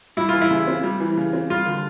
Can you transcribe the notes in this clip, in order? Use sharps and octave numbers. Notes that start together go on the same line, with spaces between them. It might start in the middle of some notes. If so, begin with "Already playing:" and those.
G3 E4
E3 F4
E4
C#3
C4
G3
E3
C#3
C4
G3 F4
D3